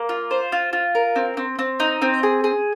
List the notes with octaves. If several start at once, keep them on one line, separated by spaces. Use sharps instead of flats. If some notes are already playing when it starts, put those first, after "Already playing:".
Already playing: A#3
F4
C5
F4
F4
A#4
C4
C4
C4
D#4
C4
G#4
G#4